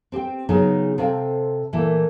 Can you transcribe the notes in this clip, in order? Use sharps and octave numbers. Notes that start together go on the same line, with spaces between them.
C4 G4 C5 G5
C#3 F#3 B3 C#4 D#4 G#4
C3 A4 C5 F5 G5 A5
A#2 E3 A3 A#3 E4